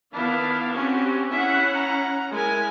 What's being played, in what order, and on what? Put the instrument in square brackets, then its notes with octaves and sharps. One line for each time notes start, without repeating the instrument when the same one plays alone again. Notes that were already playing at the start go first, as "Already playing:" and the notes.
[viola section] D#3 B3 F5 [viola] D4 E4
[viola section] C4 F#4 G4 [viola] C#4
[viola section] C#4 E4 F#5 [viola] E5
[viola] A#5
[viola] G#3 G#5 [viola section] E4 A#4